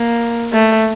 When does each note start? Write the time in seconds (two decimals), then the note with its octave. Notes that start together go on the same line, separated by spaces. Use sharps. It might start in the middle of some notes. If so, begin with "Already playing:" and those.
Already playing: A#3
0.53 A3